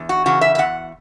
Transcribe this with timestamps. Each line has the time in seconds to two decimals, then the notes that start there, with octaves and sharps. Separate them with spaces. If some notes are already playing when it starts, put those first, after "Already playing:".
Already playing: E2
0.09 F#4
0.26 C#3 E3 F#4
0.41 E5
0.55 E5
0.58 E2 F#5